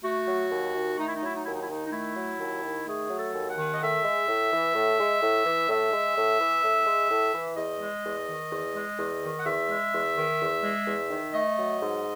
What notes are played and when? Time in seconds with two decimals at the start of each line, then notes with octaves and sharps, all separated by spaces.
0.04 A3 F#4
0.28 F#3
0.51 D#2
0.75 D#3
0.98 A3 D#4
1.07 E4
1.16 D#4
1.22 F#3 E4
1.34 D#4
1.43 D#2 E4
1.52 D#4
1.61 E4
1.68 D#3 D#4
1.87 D#4
1.92 A3 E4
2.16 F#3
2.40 D#2
2.63 D#3
2.86 A3 G#4
3.10 F#3
3.18 A4
3.34 D#2
3.49 F#5
3.57 D#3
3.72 D#5
3.81 A2 E5
4.04 G#3
4.28 A2
4.52 E3
4.75 A2
4.99 G#3
5.22 A2
5.45 E3
5.69 A2 E5
5.92 G#3
6.16 A2
6.40 E3
6.64 A2
6.87 G#3
7.10 A2
7.34 E3
7.57 E2 D#5
7.81 G#3
8.05 E2
8.28 D#3
8.51 E2
8.75 G#3
8.99 E2
9.22 D#3
9.39 F#5
9.45 E2 E5
9.69 G#3
9.93 E2
10.16 D#3
10.41 E2
10.63 G#3
10.87 E2
11.11 D#3
11.34 A3 D#5
11.58 F#3
11.81 G#2